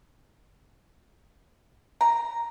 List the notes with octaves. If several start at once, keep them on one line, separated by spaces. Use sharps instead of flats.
A#5